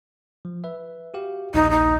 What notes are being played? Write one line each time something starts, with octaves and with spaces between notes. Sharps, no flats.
F3
B4 E5
F#4 G4 F5
A#1 D#2 D#4 D#5
D#4